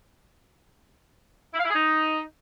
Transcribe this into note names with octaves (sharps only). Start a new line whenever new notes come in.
E4
F5
E4
G#4
D#4